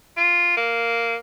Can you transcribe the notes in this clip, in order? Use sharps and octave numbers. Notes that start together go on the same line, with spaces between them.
F4
A#3